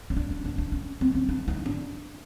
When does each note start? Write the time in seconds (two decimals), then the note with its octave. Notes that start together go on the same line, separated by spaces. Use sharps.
0.10 C#4
0.17 D4
0.30 D4
0.45 D4
0.58 D4
0.72 C#4
1.01 C4
1.15 C#4
1.29 D4
1.48 D#4
1.66 D4